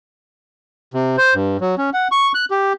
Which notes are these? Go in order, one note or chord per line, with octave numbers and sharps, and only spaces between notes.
C3
C5
G2
F#3
C#4
F#5
C#6
F#6
G4